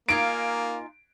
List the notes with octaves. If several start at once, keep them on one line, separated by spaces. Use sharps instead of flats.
A#3 D#4 F4 G#5 D7